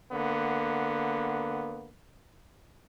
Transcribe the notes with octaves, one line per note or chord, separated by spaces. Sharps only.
D3 A#3 B3